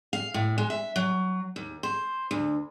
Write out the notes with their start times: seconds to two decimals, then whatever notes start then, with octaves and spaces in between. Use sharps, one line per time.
0.13 F5
0.34 A2
0.58 G#3
0.70 E5
0.96 F#3
1.56 D#2
1.83 C5
2.31 D2